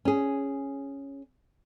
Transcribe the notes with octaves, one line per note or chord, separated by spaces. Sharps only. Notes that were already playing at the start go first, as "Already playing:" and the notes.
C#4 G#4